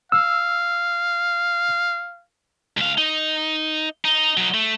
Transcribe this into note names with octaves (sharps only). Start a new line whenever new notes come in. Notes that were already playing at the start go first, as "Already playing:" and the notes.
F5 E6
C#2 F5
D#4
D#4
F#3 D#4
A3